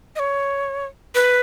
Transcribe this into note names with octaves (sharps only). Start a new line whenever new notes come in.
D#5
C#5
B4